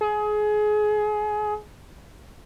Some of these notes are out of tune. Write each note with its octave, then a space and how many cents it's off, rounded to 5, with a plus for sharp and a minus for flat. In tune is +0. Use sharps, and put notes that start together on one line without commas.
G#4 +25